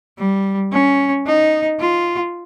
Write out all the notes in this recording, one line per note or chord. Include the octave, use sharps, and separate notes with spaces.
G3
C#4
D#4
F4